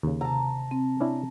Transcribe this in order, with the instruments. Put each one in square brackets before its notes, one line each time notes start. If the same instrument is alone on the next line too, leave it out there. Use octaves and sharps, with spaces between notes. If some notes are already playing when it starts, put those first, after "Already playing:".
[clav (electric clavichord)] D#2 C#3
[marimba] C3 [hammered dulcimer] A5 A#5
[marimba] C4
[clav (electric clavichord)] C#4 D4 E4